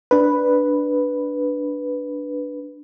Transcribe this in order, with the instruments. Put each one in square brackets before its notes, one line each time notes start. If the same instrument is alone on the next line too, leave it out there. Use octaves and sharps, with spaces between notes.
[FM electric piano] D4 B4